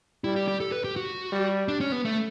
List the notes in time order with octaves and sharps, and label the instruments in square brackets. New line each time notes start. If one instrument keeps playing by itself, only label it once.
[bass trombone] G3 [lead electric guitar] E4
[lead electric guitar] G4
G4
A4
B4
G4
F#4
[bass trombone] G3
[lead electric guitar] D4
C#4
B3
A3